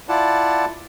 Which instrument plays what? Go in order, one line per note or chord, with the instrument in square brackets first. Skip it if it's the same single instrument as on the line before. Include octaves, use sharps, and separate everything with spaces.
[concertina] E4 F4 D5 F#5 A5